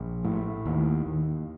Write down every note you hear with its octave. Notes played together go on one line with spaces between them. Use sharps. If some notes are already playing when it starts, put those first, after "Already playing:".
Already playing: A#1
A2
D#2
D#2